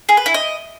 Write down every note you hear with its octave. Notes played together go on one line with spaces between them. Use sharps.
G#4
B4
E4
D#5